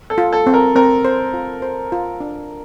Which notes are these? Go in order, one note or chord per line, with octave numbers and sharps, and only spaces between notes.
A4
F4
A4
C4
A#4
C4 A#4
C5
F4
C5
F4
D4